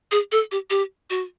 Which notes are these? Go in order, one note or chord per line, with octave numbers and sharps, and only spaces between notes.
G#4
A4
G4
G4
F#4